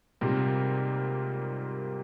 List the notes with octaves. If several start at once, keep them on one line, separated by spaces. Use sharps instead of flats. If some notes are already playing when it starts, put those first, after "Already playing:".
G#2 C3 G3 A#3 F4 A#4